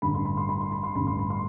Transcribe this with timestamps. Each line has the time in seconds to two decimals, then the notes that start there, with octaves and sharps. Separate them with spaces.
0.02 A1 G2 D3 B5
0.14 C6
0.25 B5
0.37 C6
0.49 B5
0.61 C6
0.72 B5
0.83 C6
0.95 A1 G2 D3 B5
1.07 C6
1.19 B5
1.30 C6